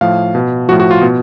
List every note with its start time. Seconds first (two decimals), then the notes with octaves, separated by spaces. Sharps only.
0.01 A2 F3 F5
0.35 B2
0.69 F3 F#4
0.72 A2
0.80 F#4
0.91 F4
1.02 B2